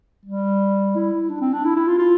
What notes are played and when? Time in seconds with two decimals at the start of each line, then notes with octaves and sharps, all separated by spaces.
0.25 G3
0.95 E4
1.29 D4
1.41 C4
1.53 D4
1.65 E4
1.76 E4
1.88 F4
1.99 F4